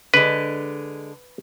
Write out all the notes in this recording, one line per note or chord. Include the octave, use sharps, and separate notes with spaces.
D3 G#3 B4